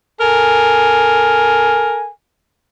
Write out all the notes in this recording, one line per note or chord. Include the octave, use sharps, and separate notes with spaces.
A4 A#4 G#5